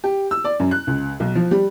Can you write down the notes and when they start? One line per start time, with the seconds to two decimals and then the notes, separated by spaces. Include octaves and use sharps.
0.04 G4
0.31 E6
0.44 D5
0.60 F#2
0.71 F#6
0.87 C#2
1.20 B1
1.35 F3
1.51 G3